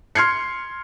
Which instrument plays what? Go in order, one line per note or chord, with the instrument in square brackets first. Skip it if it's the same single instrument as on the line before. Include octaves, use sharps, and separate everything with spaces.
[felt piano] C6 F6 G#6 C7 C#7